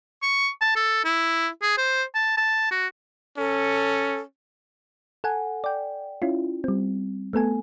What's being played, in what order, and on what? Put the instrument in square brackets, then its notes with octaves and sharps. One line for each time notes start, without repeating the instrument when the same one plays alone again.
[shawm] C#6
A5
A4
E4
G#4
C5
A5
A5
F#4
[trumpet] C#4 [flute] A4
[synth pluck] A4 F#5 G#5
D5 G5
C#4 E4 F4
G3 C4
A3 B3 A4 G#5